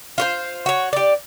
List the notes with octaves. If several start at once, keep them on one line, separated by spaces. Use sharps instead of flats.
F4 F#4 C5
F#4 C#5
G4 D5